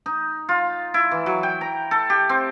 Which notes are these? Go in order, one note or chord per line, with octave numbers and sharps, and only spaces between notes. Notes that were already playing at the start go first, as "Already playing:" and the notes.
D#4
F4
E4
E3
F#3
G5
A#5
A4
G4
C4